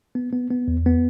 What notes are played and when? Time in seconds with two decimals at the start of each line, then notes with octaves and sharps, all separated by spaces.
0.15 B3
0.32 B3
0.51 B3
0.68 E2
0.86 B3